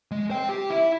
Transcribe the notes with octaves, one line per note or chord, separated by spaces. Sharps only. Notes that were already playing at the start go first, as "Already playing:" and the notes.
G#3
C5 G5
G4
E4 E5